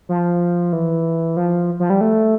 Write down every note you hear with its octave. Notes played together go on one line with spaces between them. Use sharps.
F3
E3
F3
F3
G3
A3